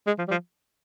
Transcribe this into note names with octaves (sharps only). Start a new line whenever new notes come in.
G#3
F3
G3
F3